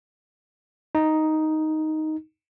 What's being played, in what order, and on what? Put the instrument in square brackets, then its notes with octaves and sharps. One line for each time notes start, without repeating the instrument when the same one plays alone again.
[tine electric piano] D#4